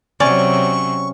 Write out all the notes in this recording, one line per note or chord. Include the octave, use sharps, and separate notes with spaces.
C3 F#3 C#4 C#5 D5 C#6